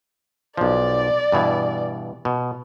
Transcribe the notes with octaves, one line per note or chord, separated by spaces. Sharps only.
B1 F3 D5
G2 B2 E3
B2